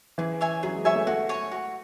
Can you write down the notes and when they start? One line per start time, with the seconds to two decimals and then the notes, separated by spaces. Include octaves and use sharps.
0.18 E3 G#4
0.41 C#5 E5 G#5
0.63 F#3 G#4
0.74 G#3
0.84 F#3 C#5 E5 G#5
0.96 A3
1.07 A3 F#4
1.29 C#5 G#5 C#6
1.52 F#4